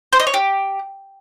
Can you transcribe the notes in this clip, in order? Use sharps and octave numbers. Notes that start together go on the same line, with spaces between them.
C5
D#5
C#5
G4